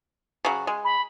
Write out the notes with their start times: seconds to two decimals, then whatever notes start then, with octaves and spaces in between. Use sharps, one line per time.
0.45 C#3 F#3
0.67 G#3
0.84 B5